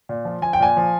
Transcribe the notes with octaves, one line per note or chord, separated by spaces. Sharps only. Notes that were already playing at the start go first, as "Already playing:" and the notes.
A#2
F3
F3 G#5
G5
A#2 G#5
F3